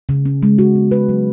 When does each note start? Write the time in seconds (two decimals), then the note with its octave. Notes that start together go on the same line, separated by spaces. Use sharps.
0.09 C#3
0.26 C#4
0.43 G#3
0.59 F#4
0.75 B3
0.91 B4
1.09 F#3